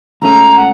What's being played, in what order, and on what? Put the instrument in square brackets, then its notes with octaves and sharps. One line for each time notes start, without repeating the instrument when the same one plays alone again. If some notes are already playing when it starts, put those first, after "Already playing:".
[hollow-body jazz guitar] C#2 C#3 A3 C#4 [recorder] A#5
[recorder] F#5